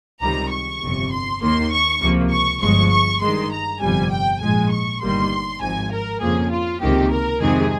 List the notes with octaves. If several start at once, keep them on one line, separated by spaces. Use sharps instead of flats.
C#2 C3 D#3 G3 A#5
C#6
G1 F2 C3
C6
D#2 D#3 A#3 C6
C#6
C#2 C3 F3 A#3
C#6
G1 G2 F3 G#3 C#6
C#6
G2 D#3 G#3 C6
A#5
G1 F2 C3 G3 G#5
G5
A#1 G#2 F3 G#3 G#5
C#6
G1 G2 D#3 G3 A#3 C6
G#1 G#2 F3 G#5
A#4
F2 C#3 F3 A#3 G#4
F4
C#2 C3 D#3 A#3 G4
A#4
F2 C3 D#3 G#3 G#4